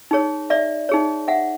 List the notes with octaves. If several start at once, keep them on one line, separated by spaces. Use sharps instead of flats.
D#4 G#4 C#5
D5 E5
D#4 G#4 C#5
E5 F#5